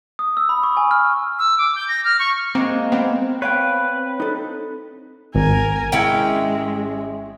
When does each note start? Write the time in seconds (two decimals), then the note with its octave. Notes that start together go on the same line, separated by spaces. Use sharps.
0.19 D#6
0.37 E6
0.49 B5
0.63 C#6
0.77 G#5
0.91 F6
1.39 E6
1.58 D6
1.76 G6
1.88 A#6
2.05 F6
2.19 C#6
2.55 G#3 A#3 C4
2.92 B3 C4
3.42 B4 C#5 F5 G5
4.20 D#4 A4
5.34 G#1 A#4 G#5
5.92 G#3 C#4 E4 G5